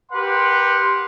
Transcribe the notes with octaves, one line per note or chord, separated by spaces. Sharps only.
G4 A#4 B4 F#5 C6